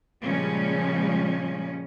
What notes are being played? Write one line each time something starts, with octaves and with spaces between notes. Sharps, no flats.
A#2 C#3 F3 G3 G#3 C#4